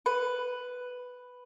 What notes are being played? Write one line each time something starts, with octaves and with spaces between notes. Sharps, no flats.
B4